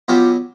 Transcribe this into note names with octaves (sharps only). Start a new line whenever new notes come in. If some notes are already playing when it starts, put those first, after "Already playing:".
B2 F#3 B3 F4 G4